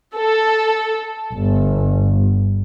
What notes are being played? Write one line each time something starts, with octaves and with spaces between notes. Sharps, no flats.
A4
G1